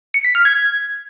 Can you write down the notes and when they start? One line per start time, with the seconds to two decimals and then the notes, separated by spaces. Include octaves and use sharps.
0.14 C#7
0.25 B6
0.35 F6
0.45 G#6